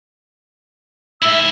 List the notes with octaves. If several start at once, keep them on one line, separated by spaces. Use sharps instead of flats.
G#2 E4 E5 E6